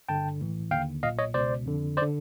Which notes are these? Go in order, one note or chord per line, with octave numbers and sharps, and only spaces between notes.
G1 G2 D3 G5 A5
A#1 A2 E3
D#2 D3 F5 G5
B1 A#2 D#5 F5
C#5 D#5
C#2 B2 C5 D5
F2 D3
C5 D5
D3